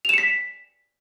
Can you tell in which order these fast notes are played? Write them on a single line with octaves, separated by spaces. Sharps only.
F7 E7 C#7 B6